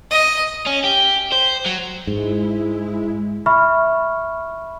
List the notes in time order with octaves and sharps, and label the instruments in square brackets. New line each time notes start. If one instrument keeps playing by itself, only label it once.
[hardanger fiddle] D#5
[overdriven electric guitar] C#4
G4
C5
F#3
[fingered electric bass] G#2 [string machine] G#3 E4
[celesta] E5 B5 C#6 F6